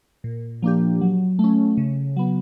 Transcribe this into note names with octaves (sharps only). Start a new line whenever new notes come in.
A#2
F3 A#3 D4 G4
F#3
A3 C#4
C#3
F#3 B3